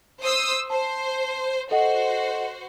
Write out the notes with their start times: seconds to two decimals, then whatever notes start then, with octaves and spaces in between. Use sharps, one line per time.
0.22 C5 D#6 E6
0.70 C5 A5
1.71 F#4 A4 C5 D#5 F#5